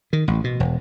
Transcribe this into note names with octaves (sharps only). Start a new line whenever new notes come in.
D#3
A1
B2
E1